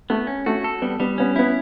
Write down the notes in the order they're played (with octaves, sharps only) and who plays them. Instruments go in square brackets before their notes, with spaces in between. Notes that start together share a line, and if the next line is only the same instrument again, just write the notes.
[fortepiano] A3 [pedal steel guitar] B3
[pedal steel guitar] C#4
[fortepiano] A3 [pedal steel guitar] F#4
[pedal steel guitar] A4
[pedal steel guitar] G3 [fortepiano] B3
[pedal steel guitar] G3 [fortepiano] B3
[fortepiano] B3 [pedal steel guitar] C#4
[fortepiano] B3 [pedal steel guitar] E4